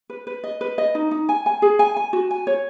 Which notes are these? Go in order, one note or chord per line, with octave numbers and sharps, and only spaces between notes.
B4
B4
D#5
B4
D#5
D#4
D#4
G#5
G#5
G#4
G#5
G#5
F#4
G#5
C#5